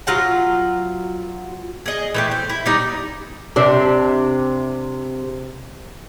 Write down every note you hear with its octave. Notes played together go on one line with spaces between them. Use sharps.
F#3 F4 F#5
G#4 D#5
E3 A3 G4
C5
E4
G3 D#4
C3 D4